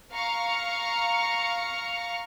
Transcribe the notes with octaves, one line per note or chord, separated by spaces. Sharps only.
F5 A#5 C#6 F6 C#7